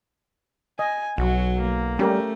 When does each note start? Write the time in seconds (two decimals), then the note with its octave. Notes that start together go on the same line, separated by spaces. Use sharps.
0.79 D#5 G#5
1.18 B1 F#3 F#4
1.58 A#3
1.99 G3 A3 C#4 G4 A#4